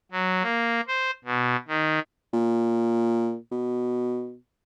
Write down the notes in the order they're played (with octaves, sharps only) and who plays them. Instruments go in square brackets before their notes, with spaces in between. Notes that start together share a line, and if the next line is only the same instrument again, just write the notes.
[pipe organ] F#3
A#3
C5
B2
D#3
[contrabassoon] A#2
B2